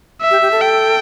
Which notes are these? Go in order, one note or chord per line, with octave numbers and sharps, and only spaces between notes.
E5
G4
G4
A4
G5